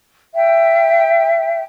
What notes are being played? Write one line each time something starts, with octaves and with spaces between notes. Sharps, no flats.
E5 G5